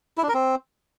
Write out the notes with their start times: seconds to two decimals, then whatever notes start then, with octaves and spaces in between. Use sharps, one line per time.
0.18 E4
0.23 D4
0.29 A#4
0.34 C4